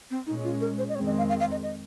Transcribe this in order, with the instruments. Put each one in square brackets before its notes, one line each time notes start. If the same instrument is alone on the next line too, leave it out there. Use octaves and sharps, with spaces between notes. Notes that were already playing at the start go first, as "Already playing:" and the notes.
[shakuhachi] C4
[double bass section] A#2 G#3 C#4 [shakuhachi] D#4
[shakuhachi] F4
A#4
C5
D#5
[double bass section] F2 D#3 G#3 C4 [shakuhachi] C#5
[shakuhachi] D#5
F5
F5
F5
D#5
D#5